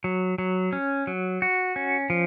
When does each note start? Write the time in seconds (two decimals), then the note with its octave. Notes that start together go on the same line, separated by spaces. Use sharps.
0.04 F#3
0.38 F#3
0.73 C#4
1.07 F#3
1.42 F#4
1.76 C#4
2.10 F3